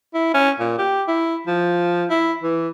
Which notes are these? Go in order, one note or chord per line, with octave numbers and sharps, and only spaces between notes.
E4
C#4
A#2
G4
E4
F3
E4
E3